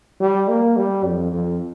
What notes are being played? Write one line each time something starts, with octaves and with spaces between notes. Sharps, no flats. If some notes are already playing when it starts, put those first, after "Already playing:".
G3
A#3
G3
F2
F2